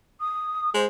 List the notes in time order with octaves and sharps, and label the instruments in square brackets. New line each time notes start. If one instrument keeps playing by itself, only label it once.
[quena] D#6
[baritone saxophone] G#3 [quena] C5